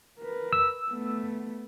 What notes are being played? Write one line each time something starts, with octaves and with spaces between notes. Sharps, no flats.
A#4 B4
E6
A3 B3